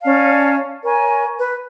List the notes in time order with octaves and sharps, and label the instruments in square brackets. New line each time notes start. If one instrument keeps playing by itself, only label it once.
[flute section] C#4 D5 F5 A5
A#4 C#5 G#5 C#6
B4